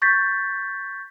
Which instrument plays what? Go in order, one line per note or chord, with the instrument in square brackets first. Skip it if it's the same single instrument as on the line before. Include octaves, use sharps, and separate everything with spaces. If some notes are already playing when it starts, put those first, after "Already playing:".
[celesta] C#6 G6 A6 B6